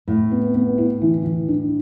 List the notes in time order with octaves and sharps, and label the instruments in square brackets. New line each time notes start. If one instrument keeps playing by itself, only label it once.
[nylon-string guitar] A2 [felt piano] E4
[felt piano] B3
B3
E4
E3
E3
D4